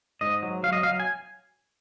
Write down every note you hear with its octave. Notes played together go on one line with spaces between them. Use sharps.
G#2 D#5
F#3
F#3 F5
D#5
F#3 F5
G#5